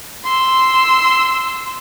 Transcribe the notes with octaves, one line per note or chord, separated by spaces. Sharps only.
C6 E6